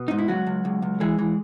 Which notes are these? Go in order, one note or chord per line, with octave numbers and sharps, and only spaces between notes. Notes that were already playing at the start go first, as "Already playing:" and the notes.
Already playing: B2 B3
G#2 D#4
E4
C#2 F#3 F#4
C#2
C#2
C#2
E3 G#3 G#4
E3